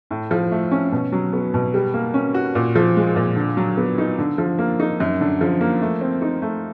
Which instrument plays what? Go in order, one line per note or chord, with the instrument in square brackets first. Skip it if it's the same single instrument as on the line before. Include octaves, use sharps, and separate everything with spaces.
[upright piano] A2
F3
A3
C#4
B2
F#3
B3
B2
G3
A#3
C#4
F#4
A#2
F3
G#3
A#2
D3
F#3
B3
D#4
D3
F3
A#3
D#4
F#2
D3
F3
A#3
A3
C4
D#4
A3